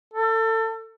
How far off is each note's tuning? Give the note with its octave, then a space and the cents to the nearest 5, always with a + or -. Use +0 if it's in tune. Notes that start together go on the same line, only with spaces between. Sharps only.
A4 +30